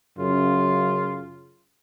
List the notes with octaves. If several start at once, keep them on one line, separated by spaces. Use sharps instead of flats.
F#2 C#3 F4